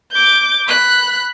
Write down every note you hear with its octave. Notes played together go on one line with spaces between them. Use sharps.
D6 G6
B5 F#6